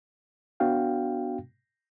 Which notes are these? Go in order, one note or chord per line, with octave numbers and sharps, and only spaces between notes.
B3 D4 F#4 F5 G5